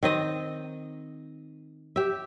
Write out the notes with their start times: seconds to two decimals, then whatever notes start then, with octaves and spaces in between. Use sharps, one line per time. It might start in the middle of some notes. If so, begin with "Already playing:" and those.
0.03 D#3 C4 D#5
1.96 G4 E5